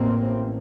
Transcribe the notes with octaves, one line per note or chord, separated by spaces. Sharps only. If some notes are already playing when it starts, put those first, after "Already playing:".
Already playing: A1 A2 A#3 C4